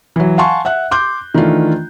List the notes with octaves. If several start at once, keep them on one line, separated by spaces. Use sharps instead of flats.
E3 F#3
F5 F#5 G#5 A5 C6 C#6
E5 F#5 F#6
C6 D6 G6
D#3 E3 A3 D4 F4